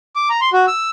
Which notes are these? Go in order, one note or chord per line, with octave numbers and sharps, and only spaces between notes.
D6
A#5
C6
F#4
E6